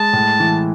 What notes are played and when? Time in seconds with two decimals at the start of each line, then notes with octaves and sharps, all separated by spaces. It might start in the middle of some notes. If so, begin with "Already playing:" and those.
Already playing: G#3 A5
0.13 A2
0.40 E3